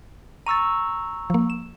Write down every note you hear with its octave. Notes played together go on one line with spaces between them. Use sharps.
A#5 C#6 E6 A6 D#7
F3 A#3
E7